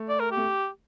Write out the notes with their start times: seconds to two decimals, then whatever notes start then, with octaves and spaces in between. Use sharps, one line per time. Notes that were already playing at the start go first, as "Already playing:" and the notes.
Already playing: A3
0.09 D5
0.20 A#4
0.32 G4
0.37 A3